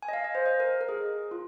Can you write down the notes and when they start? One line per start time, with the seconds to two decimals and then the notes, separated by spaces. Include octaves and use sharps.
0.03 G#5
0.09 D#5
0.13 F5
0.24 D#5
0.35 C5
0.46 D#5
0.60 A#4
0.81 A#4
0.89 G#4
1.31 F4